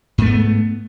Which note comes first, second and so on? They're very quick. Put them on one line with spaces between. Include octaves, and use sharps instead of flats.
G#2 A3 B3